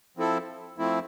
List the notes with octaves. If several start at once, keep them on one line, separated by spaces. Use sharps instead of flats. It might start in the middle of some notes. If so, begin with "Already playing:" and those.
F3 C4 E4 A4
F3 A3 C4 E4